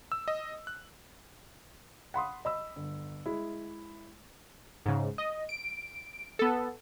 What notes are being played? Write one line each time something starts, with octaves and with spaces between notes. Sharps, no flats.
E6
D#5
F#6
F#5 B5 C6 D#6
D#5 B5 E6
G1
G#3 E4
G#2 C#3
D#5
D7
B3 A4